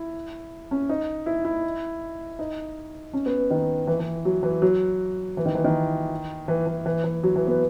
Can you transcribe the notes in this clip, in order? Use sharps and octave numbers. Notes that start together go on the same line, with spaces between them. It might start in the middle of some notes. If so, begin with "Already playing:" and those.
Already playing: E4
C#4
D#4
E4
E4
D#4
C#4
B3
D#3
E3
E3
F#3
E3
F#3
E3
D#3
E3
D#3
E3
E3
E3
E3
F#3
E3
B3